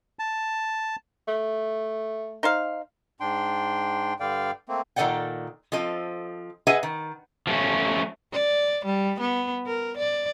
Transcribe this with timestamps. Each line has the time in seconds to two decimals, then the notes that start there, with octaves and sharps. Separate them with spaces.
0.19 A5
1.28 A3
2.43 D#4 C5 F5
3.20 G#2 D4 G5 C6
4.20 G2 D3 D5 F5 G5
4.69 A3 A#3 C4
4.96 A#2 D#3 A4 D5 F#5 G5
5.72 F3 C4 A4 D#5
6.67 G#4 B4 D#5 E5 F#5 G#5
6.83 D#3
7.47 F3 A3 C4 C#4
8.33 D5
8.85 G3
9.20 B3
9.66 A#4
9.97 D5